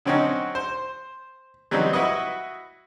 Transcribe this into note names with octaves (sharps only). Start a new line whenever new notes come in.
D3 F#3 C4 C#4 D#4 F#4
C5
E3 F#3 G3 C4 D#4
E4 F#4 B4 D#5